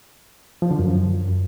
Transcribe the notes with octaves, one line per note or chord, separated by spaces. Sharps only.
F3
D3
F#2